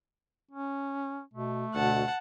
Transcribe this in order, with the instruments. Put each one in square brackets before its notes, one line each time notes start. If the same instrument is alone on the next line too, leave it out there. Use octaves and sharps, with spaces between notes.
[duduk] C#4
[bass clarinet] B2 [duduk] A3
[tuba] D2 [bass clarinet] B2 [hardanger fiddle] F#5 A5